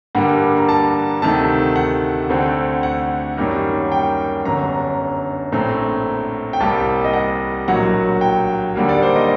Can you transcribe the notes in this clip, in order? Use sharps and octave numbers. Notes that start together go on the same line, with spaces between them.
G2 D3 G3 A#3 F#5
A#5
A5
D2 C3 D#3 A3 A5
F#5
D2 D3 A3 C4
F#5
F#2 D#3 G3 A#3
G5
G1 F#2 D3 A#5
A#1 A2 A3 C4 A#5
G5
C2 C3 G3 A#3 A5
D#5
F#5
A#1 A2 F#3 A#3 F#5
G5
D#2 D3 G3 A#3
D5
C5
D#5